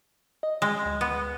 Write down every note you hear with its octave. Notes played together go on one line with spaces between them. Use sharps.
D#5
G#3
D2
B3